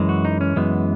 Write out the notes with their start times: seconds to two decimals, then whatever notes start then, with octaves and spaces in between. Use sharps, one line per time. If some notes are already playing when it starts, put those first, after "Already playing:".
Already playing: F#2 E3 G#3
0.09 F#4
0.25 D#4
0.41 C#4
0.56 F#2 E3 G#3 B3